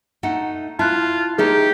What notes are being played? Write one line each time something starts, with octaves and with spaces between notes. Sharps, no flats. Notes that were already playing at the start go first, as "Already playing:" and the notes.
A3 D#4 F#5
E4 F4 A5 F#6
A3 D#4 G4 G#4 C#5